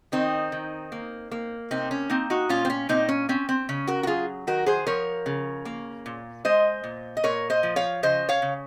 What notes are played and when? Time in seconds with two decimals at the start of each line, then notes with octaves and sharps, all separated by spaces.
0.12 D#3 C4 D#4
0.52 D#3
0.92 A#3
1.31 A#3
1.71 C3 C4 D#4
1.91 C#4
2.10 A#3 C4 D#4
2.30 D#4 F#4
2.49 A#2 C#4 F4
2.65 C4
2.70 C#4
2.89 A#2 C4 D#4
3.09 C#4
3.29 C4 C#4
3.49 C4
3.69 C#3 C#4
3.87 F#4 A#4
4.03 F#4
4.07 F#3 F4 G#4
4.47 D#3 F#4 A#4
4.66 G#4 C5
4.87 F3 A#4 C#5
5.26 C#3
5.65 A#3
6.06 A#2
6.45 G#3 C5 D#5
6.84 A#2
7.17 D#5
7.24 A#2 A#4 C#5
7.50 C5 D#5
7.63 F3
7.76 C#5 F5
8.03 C#3 C5 D#5
8.29 C#5 F5
8.42 C#3